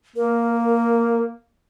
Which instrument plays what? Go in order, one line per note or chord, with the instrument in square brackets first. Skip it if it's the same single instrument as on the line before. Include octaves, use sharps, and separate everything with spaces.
[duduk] A#3 [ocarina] A#4